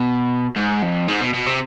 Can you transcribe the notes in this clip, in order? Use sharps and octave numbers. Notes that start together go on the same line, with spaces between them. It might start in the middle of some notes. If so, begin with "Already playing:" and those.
Already playing: B2
G#2
F2
G#2
B2
B2
C3